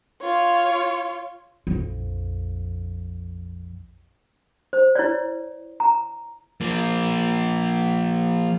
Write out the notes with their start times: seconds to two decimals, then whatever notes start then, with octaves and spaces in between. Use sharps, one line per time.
0.22 F4 C#5
1.67 A#1 F2
4.73 C5
4.95 E4 B4 C#5 D5
5.80 A#5
6.61 F3 A#3